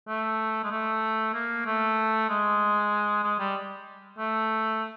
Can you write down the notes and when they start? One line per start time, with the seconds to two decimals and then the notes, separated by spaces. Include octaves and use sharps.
0.08 A3
0.64 G#3
0.70 A3
1.34 A#3
1.66 A3
2.29 G#3
3.24 G#3
3.39 G3
4.18 A3